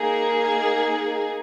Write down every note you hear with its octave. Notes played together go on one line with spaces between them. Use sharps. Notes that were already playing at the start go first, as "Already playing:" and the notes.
Already playing: A#3 D#4 G#4